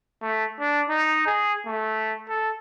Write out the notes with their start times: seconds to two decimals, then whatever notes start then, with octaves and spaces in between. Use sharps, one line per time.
0.22 A3
0.60 D4
0.90 D#4
1.26 G#4
1.66 A3
2.29 A4